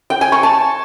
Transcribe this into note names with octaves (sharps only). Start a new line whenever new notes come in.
G5
G#5
C#6
A5